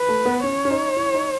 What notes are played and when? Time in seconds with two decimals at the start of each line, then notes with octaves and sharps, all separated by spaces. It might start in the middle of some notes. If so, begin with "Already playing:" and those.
Already playing: B4
0.09 A3
0.26 B3
0.43 C#4 C#5
0.65 C#4
0.70 D#4
0.96 E4
1.14 D#4